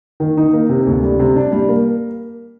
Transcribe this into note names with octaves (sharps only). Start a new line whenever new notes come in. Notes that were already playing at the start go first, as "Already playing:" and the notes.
D#3
D#4
A#3
C3
D2
G3
C3
D4
G3
A#3